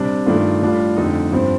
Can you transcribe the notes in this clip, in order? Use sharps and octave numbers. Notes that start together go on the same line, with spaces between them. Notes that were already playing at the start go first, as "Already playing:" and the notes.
Already playing: C3 G3 D4
G2 D#3 A3 D4 F4
A2 G3 D4 F4
F2 D3 A3 D#4
G2 F3 C4